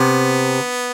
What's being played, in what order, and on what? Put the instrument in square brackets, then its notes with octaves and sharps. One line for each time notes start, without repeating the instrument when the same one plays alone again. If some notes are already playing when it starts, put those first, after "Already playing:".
Already playing: [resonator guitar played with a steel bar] C3 [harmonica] B3